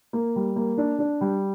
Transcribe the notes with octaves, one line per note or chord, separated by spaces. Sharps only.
A#3
G3
A#3
D4
D4
G3